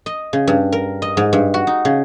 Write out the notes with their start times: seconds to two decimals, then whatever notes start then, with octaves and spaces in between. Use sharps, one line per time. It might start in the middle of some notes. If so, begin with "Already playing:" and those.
0.06 D#5
0.33 C#3
0.47 G2
0.72 A#4
1.02 D#5
1.17 G#2
1.33 G2
1.54 F#4
1.67 D#4
1.85 C#3